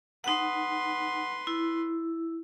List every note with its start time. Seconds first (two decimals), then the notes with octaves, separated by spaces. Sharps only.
0.24 D#4 B4 F#5 C6
1.47 E4